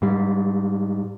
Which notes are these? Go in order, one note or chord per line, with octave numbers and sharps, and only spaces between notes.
G#2 G3